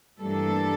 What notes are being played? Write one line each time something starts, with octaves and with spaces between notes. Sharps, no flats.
G2 E3 G3 A3 A#3 D4 A4